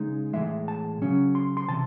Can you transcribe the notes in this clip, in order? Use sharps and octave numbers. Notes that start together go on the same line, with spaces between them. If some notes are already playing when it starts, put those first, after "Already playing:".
Already playing: C#3 G#3 D#4
A2 E3 G#3 E5
A5
C#3 F#3 C#4
C6
C6
C3 E3 A5